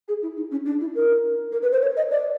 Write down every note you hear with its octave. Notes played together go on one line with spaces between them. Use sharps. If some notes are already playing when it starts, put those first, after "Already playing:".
G#4
E4
D#4
C#4
D4
E4
A#4
A#4
B4
C5
C#5
D#5
D5